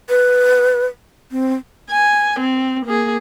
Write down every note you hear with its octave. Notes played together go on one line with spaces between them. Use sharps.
B4
C4
G#5
C4
A#3 G#4